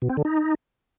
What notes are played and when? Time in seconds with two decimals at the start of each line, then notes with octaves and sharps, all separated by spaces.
0.02 B2
0.10 C4
0.17 D3
0.25 D#4